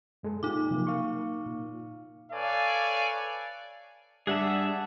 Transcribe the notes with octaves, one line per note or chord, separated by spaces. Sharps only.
F#2 G#3 A4
A#2 D#4 F4 G4 D6
C3 F3 F#3 A#3
F5 C#6
A#2
A4 B4 C#5 D5 F5 G#5
G2 G4 G#4 D5 E5 F#5 A5 F#6